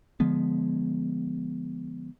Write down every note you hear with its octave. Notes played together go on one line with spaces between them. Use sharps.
D3 F3 G#3 B3